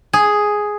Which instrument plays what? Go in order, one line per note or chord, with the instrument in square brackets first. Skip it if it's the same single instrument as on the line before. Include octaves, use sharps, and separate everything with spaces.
[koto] G#4